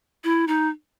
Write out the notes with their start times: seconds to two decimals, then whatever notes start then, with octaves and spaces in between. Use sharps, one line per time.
0.24 E4
0.48 D#4